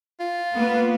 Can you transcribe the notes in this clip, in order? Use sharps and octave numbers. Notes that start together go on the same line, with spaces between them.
F4
A#3 B3 B4